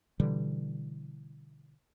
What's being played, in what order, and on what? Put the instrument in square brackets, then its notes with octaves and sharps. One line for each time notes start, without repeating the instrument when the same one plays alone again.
[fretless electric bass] B2 D3 E3 G3